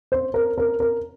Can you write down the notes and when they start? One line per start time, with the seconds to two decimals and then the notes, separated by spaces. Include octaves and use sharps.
0.12 C5
0.34 A#4
0.58 A#4
0.80 A#4